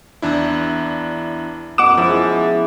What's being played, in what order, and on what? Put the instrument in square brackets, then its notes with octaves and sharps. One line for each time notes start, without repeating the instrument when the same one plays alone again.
[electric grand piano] E2 D4 E4
[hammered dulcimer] F#2 B2 [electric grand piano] F#5 F#6 E7 [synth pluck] D6
[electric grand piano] F3 [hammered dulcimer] G#3 E4